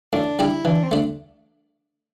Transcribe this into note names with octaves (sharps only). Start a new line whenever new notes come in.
A2 D4
G3 D4 E4 G4
E3 D4
C4
A3 D4